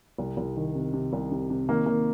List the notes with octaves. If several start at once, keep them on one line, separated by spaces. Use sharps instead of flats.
C2
C2
D#3
C3
C3
C2
C3
C3
D#3 A#3
D#3 A#3